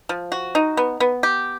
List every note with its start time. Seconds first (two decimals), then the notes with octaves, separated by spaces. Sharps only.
0.09 F3
0.32 F#4
0.55 D#4
0.77 B3
1.00 B3
1.23 G4